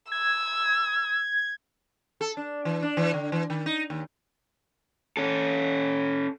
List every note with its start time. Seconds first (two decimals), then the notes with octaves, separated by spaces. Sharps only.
0.12 E6 G#6
2.21 A4
2.37 D4
2.65 E3
2.83 D4
2.97 E3
3.14 D3
3.32 E3
3.50 D#3
3.66 D#4
3.90 D#2
5.17 C#4 A4